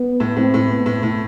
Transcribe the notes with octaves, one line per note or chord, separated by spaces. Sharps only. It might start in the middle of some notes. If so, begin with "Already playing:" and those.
Already playing: B3
A2
A2 C4
A2
B3
A2
A2